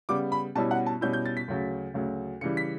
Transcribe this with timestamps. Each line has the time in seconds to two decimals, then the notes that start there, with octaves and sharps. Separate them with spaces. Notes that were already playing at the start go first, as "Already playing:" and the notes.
0.09 C#3 G3 B3 D6
0.32 B5
0.55 B2 G3 C#4 E4 A5
0.71 F#5
0.86 A5
1.01 B2 G3 C#4 E4 G6
1.13 G6
1.26 A6
1.37 B6
1.48 D2 C#3 F#3
1.94 D2 C#3 F#3
2.41 C#3 E3 G3 C#7
2.57 B6